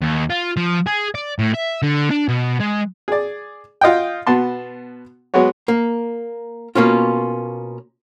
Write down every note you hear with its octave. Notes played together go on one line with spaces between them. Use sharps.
D#2
F4
F3
G#4
D5
A2
E5
D3
D4
B2
G#3
G#4 D5
F4 D#5 F#5 G5
B2 B3 A5 C6
F#3 G#3 B3 F#4 C#5
A#3
B2 A#3 C#4 F4